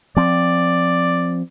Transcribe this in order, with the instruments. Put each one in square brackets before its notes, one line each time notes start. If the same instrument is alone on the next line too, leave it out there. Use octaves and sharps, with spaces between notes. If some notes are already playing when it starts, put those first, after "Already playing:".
[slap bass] F3 C4 [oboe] D5